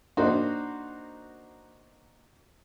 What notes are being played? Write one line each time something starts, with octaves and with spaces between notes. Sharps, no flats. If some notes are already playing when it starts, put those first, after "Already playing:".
A#3 D4 D#4 F#4 C5